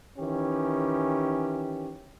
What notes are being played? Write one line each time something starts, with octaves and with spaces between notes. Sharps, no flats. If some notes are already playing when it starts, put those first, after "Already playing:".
D#3 E3 C#4 G4